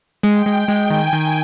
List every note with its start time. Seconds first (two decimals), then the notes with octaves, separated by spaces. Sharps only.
0.23 G#3 G5
0.46 G#3
0.68 G#3
0.90 D#3 G#5
1.13 D#3